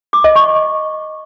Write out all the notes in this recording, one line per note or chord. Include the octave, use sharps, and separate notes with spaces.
D6
D#5
C#6